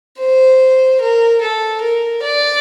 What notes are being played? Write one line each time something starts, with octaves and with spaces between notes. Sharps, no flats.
C5
A#4
A4
A#4
D5